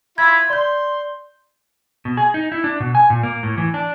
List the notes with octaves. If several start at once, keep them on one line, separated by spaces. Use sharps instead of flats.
E4 F4 B5 G#6
D5 C6 G6
B2
G#4
D#4
E4
D4
B2
G#5
A#2
A#3
A2
E3
D4